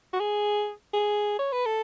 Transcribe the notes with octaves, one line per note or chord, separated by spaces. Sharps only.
F#4
G#4
G#4
C#5
B4
A4